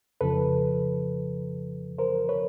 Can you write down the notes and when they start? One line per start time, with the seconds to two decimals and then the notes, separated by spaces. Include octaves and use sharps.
0.21 F2 C#3 F3 A4 B4
1.98 A#4 C5
2.29 B4 C#5